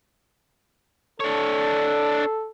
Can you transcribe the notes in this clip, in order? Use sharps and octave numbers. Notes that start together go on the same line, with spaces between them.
D4 A4 C#5